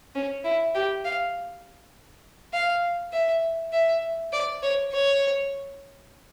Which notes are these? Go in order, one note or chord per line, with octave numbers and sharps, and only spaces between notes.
C#4
E4
G4
F5
F5
E5
E5
D5
C#5
C#5